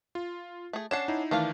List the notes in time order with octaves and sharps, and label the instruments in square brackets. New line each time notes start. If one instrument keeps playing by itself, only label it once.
[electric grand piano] F4
[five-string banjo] A3 G#4
[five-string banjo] C#4 D4 F#5 [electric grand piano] C7 E7
[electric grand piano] D#4 E4
[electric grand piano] D#3 E3 [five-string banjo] A3 D4 F5